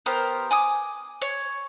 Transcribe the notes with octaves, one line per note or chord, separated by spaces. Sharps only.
B3 G4 A#4 C5
G#5 D6 D#6
C#5